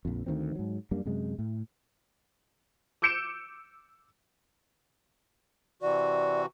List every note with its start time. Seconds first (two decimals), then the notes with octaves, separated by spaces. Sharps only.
0.05 A#1 F2
0.26 D2 D#3 F#3 C4
0.55 G#2 F#3
0.91 F#2 G3 A#3 D4
1.06 F#2 C3 G#3
1.39 A2
3.02 D6 E6 G6 C#7 D7 E7
5.82 C3 E3 F#4 D5